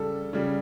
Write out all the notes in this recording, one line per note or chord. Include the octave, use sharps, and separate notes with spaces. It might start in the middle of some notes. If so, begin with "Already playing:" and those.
Already playing: C#3 G3 A4
C#3 G3